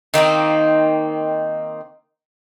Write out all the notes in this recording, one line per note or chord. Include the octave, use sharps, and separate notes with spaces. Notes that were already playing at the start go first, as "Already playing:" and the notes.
D#3 A#3 C4 D#4